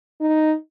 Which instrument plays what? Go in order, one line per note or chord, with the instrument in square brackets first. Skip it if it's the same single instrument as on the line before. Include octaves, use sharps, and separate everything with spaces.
[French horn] D#4